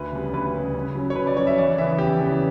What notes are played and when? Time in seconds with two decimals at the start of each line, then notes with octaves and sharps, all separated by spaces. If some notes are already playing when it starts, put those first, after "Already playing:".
Already playing: D2 B4
0.12 C#3 G3 B3
0.34 D2 B4
0.54 C#3 G3 B3
0.74 C#3
0.95 F#3 C#4
1.10 C#5
1.15 C#3 B4
1.27 D5
1.37 F#3 C#4 C#5
1.47 E5
1.57 E2 D5
1.78 C#3 E3 B3 E5
1.98 E2 G4
2.19 C#3 E3 B3